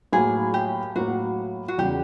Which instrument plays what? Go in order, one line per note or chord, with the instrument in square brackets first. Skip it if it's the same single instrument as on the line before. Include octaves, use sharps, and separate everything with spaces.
[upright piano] A2 F#3 A#3 [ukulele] G#4
[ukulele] G4
[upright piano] A2 F#3 A#3 [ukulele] F#4
[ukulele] F#4
[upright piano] E2 C#3 F#3 [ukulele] G4